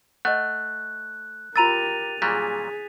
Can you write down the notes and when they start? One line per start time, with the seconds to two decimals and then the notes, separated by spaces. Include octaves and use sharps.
0.25 A3 D#5 F#5 F#6
1.56 F4 G4 A#4 A#5 E6 A6 D#7 F7
2.22 A#2 F#3 G3 G#4 B6